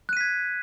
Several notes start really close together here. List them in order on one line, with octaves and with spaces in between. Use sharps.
F#6 D#7 B6 G#6